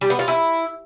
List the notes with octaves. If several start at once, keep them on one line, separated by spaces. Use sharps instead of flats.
G3
B3
F4
E4